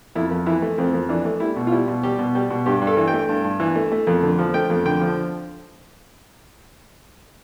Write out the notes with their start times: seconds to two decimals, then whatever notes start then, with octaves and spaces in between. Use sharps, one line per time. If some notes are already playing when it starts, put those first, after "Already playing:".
0.15 F2 E4
0.30 F2
0.46 E3 E4
0.62 A3
0.78 F2 C4
0.93 F2
1.09 E3 D4
1.25 A3
1.40 G3 E4
1.56 B2
1.67 F4
1.72 G3 E4
1.88 B2
2.03 G3 G4
2.19 B2
2.35 G3 G4
2.50 B2
2.66 G2 G4
2.81 G2
2.87 A4
2.97 E3
3.08 G5
3.13 A3
3.29 G2
3.44 G2
3.60 E3
3.75 A3
3.92 A3
4.07 F2
4.23 D3
4.38 F3
4.54 A3 G5
4.70 F2
4.85 D3 G5
5.01 F3